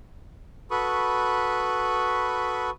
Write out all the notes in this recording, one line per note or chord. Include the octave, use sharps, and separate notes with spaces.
F#4 A4 B4 B5 C#6 D#6